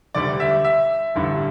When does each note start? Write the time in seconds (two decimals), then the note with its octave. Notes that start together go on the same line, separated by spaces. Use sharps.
0.15 E1 D2 D3 G3 D5
0.40 E5
0.65 E5
1.15 A1 G2 D3 G3